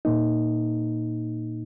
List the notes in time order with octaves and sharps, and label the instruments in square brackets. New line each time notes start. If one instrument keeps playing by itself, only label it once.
[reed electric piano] A#2 A#3 D#4